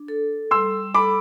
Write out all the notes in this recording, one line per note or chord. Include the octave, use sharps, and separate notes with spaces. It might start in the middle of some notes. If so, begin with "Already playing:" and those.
Already playing: D4
A4
G3 C6 E6
A4 B5 D6